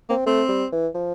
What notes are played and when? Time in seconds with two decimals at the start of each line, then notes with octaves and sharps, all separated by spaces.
0.10 A#3 C4
0.26 A3 C4
0.49 G3
0.72 E3
0.95 F3